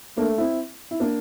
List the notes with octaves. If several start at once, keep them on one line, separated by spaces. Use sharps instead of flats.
A3 A#3 D4
C4 E4
E4
A#3 D4